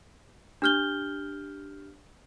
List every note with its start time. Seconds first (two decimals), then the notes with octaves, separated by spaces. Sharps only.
0.62 D4 G4 F6 G6 G7